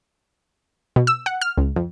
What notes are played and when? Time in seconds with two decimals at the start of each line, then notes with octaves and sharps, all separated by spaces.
0.96 B2
1.07 E6
1.26 F#5
1.41 F6
1.58 C#2
1.76 F2